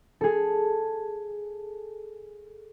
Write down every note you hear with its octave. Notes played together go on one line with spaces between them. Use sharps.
G#4 A4